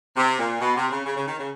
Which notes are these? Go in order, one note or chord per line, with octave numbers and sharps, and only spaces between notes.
C3
A#2
B2
C3
C#3
C#3
C#3
D#3
C#3